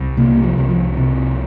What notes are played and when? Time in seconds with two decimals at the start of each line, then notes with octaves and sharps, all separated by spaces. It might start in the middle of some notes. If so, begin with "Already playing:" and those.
Already playing: C2
0.17 C3 A#3
0.44 F3
0.58 C2
0.70 F3
0.97 C3